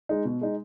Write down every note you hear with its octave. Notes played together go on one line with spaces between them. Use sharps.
G#3 D#4
B2
G#3 D#4